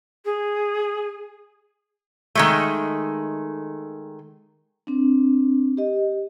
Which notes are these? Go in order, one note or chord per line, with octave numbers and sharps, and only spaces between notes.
G#4
D#3 G#3 A3
C4 D4
G4 D#5